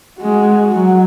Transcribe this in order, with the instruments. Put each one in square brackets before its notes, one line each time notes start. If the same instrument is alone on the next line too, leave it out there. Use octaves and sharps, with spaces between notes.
[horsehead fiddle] G#3 [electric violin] F#4
[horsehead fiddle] F#3